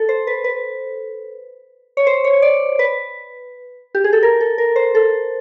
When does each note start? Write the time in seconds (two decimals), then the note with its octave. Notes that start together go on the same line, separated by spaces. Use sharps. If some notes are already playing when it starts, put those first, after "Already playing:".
Already playing: A4
0.09 C5
0.27 B4
0.44 B4
1.97 C#5
2.07 C5
2.24 C#5
2.42 D5
2.79 B4
3.95 G4
4.04 G#4
4.13 A4
4.23 A#4
4.41 A4
4.58 A#4
4.76 C5
4.95 A4